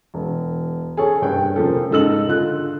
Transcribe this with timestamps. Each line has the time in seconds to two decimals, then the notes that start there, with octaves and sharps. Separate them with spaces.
0.14 E1
0.97 G#4 A4 C#5
1.21 F#1 G2 G5
1.56 F1 C#3 F3 A#3 A4
1.91 G#2 C#3 D#4 A4 E6 F#7
2.28 D3 F4 F#6